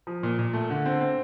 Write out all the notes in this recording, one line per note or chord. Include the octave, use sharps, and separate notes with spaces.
F3
A#2
A#2
A3
D3
C4
C4